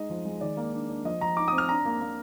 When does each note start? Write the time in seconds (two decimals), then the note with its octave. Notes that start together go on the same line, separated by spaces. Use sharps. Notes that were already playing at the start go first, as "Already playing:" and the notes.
Already playing: G#3 D#4 D#5
0.10 F3
0.25 G#3
0.41 D#3 D5
0.57 A#3
0.73 D4
0.90 D4
1.05 F3 D#5
1.21 F3 A#5
1.37 D#4 D6
1.48 C4 D#6
1.58 F6
1.69 D4 A#5
1.85 A#3
2.01 A#3